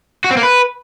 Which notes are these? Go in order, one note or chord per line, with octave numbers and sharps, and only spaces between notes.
F#4
C4
A#3
B4